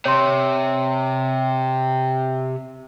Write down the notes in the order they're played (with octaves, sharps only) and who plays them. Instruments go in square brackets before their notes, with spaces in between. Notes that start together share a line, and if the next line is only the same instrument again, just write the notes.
[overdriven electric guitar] C3 [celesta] C#5 C6